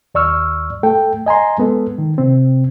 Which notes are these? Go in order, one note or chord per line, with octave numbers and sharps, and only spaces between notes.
D#2 D5 C#6 E6 F6
A3 A4 G5
D#5 G#5 A#5 C6
G#3 B3 A4
D#3
C3 C4